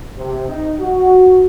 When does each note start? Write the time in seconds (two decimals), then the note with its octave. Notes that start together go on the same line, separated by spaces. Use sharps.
0.18 C3
0.48 D#4
0.80 F#4